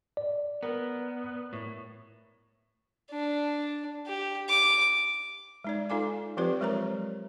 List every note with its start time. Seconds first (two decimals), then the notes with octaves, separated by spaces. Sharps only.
0.17 D5
0.63 B3 A#4 B4
1.53 A2
3.11 D4
4.07 G4
4.49 D6
5.64 G#3 D#4 D5
5.90 D#4 F4 A4 F5 G#5 D6
6.37 F3 C4 F4 G4 B4 D5
6.60 F#3 G#3 A#4 C5 C#5 A#5